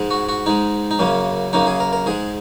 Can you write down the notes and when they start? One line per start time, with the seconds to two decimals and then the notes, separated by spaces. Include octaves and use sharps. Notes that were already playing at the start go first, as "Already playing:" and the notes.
Already playing: G#2 G#3
0.11 F#4
0.29 F#4
0.46 G#2 G#3 D#4
0.91 D#4
0.99 F#2 C#3 A#3 C#4
1.53 F#2 C#3 A#3 D#4
1.67 G#4
1.80 A#4
1.93 A#4
2.06 G#2 G#3 G#4